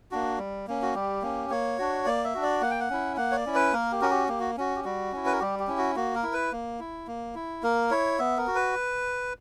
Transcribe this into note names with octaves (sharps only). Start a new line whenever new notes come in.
A#3 D4 F#4
G3
A#3 C#4
F#4
G3 G4
A#3 C#4
A#3 C#5
D4 F#4
A#3 D5
E5
D4 F#4
D5
A#3 F#5
G5
F#5
C#4 E4
A#3 F#5
C#5
D5
C#4 E4
B4
A#3 A#4
G4
C#4 F#4 A#4
G4
A#3 G4
F#4
C#4 F#4
G4
G3 F#4
C#4 E4
B4
A#4
G3 G4
G4
C#4 E4
F#4
A#3 F#4
A#4
E4
B4
A#3
E4
A#3
E4
A#3 A#4
E4 C#5
B3 E5
A#4
F#4
B4